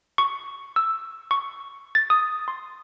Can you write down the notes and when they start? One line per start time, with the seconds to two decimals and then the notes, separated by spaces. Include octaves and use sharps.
0.18 C#6
0.76 E6
1.31 C#6
1.95 A6
2.10 D#6
2.48 C6